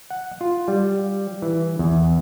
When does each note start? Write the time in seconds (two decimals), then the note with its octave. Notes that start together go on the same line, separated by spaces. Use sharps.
0.10 F#5
0.41 F4
0.68 G3
1.42 E3
1.79 E2